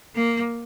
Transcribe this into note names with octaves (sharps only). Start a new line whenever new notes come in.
A#3